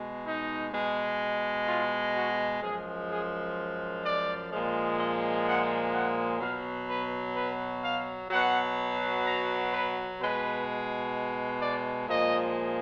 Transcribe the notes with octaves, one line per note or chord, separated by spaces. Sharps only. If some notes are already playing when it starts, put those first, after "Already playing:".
Already playing: B2 G#3
D#4
B2 G#3
F4
F#4
F#2 F3 G#3 G#4
G#4
D5
A#2 F3 G#3
D#5
F#5
F#5
B2 F#3 F5
B4
B4
F5
B2 F#3 F#5
A#5
B4
B2 G#3 B4
D5
A#2 F3 G#3 D#5